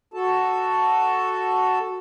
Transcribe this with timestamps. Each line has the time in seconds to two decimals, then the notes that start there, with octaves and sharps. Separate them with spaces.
0.14 F#4 A4 A5